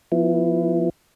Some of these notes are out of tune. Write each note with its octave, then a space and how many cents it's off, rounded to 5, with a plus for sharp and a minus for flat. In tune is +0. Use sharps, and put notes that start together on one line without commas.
F3 +0 B3 +0 E4 +10